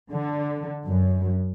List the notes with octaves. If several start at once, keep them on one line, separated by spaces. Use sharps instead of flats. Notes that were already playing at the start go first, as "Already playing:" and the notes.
D3
F#2